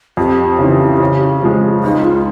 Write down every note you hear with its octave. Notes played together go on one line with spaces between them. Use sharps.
F2 G4
C#3 E3
C#3
F3 G#3
C#2 D#4
F4